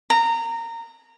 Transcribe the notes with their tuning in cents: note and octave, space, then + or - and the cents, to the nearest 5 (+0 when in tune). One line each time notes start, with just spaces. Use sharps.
A#5 -20